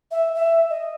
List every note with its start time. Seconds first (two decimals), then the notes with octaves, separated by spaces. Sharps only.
0.11 E5
0.35 E5
0.70 D#5